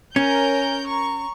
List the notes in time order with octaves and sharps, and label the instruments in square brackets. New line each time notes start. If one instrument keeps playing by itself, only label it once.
[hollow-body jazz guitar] C#4 [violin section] A#4 C#5 G6 [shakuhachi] G#5
[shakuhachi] A#5 [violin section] C#6